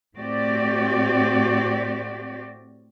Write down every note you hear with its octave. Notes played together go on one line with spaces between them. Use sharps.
A2 C4 F#4 G4 D5